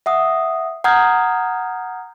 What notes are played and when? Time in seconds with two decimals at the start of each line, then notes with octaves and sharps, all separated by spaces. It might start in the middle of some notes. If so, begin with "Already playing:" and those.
0.06 E5 F#5 D#6
0.84 F#5 A#5 D#6 F6 G6 G#6